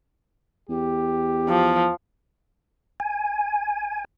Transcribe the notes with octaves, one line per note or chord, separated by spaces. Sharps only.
E2 G4
F3
G#5